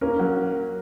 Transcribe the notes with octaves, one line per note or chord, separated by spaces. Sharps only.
A#3 C#4 A#4
F#3